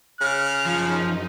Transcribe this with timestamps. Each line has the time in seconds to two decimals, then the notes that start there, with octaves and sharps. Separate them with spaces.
0.21 C#3 F6
0.66 F#2 F3 D#4